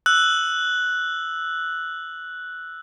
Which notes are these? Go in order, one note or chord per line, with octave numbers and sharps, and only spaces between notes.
E6 F#6 F#7